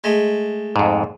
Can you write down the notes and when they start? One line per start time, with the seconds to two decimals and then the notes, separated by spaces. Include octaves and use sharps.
0.04 G#3 A3
0.76 F2 G#2